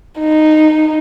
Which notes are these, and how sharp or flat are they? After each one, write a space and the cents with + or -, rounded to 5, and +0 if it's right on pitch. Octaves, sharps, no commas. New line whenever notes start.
D#4 -10